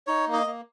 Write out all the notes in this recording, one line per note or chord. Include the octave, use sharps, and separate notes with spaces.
D#4 C#5
A#3
D#5
A#3